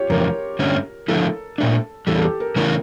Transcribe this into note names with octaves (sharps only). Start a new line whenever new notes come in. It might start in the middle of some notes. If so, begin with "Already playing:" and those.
Already playing: F4 G4 C#5
F2 C#3 E3 A3 A#4
G2 D3 A3 C#4
D3 F3 A3 E4 A4
A#2 A3 D4
E2 E3 G3 A4
A4
G4
A#4
C#3 E3 A3 C#4 E4 A#4